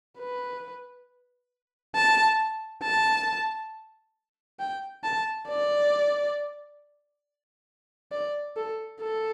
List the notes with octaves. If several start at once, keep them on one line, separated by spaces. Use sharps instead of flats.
B4
A5
A5
G5
A5
D5
D5
A4
A4